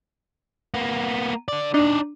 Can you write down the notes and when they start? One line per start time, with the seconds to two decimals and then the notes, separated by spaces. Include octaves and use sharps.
0.74 A#3 B3
1.48 D3 D5
1.74 D4 D#4 D5